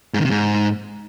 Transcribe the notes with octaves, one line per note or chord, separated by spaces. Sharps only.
G#2
D#3
C3
G#2